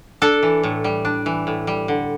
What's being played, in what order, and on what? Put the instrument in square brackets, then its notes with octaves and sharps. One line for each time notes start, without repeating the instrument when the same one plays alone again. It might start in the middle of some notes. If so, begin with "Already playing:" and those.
[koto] D4 A4
E3
A2
G3
D4
E3
A2
G3
D3